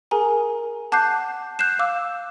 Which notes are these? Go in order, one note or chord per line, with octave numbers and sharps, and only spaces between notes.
G#4 A#4 G#5 A#5
F#5 A5 D6 F#6 G6 C7
F#6 G6 C7 E7
F5 D6 E6